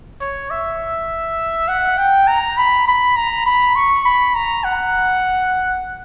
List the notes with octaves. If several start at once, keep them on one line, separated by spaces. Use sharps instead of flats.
C#5
E5
F#5
G5
A#5
B5
B5
A#5
B5
C#6
B5
A#5
F#5